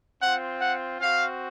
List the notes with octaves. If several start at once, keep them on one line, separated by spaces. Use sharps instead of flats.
C4 F4 F#5
F#5
C4 F#4 F5